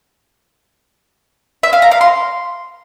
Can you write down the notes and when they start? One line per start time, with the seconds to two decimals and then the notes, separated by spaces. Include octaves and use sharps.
1.63 E5
1.73 F5
1.82 A#5
1.91 F5
2.01 C6